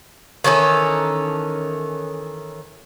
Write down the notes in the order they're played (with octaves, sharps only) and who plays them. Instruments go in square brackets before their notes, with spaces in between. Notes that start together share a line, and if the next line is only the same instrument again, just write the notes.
[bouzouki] D#3 E3 C#4 A4